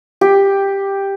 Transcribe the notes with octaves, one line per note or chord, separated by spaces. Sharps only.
G4